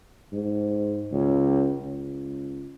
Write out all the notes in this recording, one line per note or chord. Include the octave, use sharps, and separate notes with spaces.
G#2
C#2
C#2